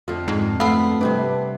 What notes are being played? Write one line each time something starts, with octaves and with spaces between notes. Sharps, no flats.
F2 D3 F4
G#2
A3 B3 F5
C3 G3 D4 B4